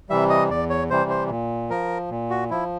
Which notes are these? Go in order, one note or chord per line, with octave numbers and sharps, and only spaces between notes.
C3 E3 G3 E5
D#5
E2 D5
C#5
C3 E3 G3 C5
C5
A#2
F3 A#4
A#2
F#4
F3 E4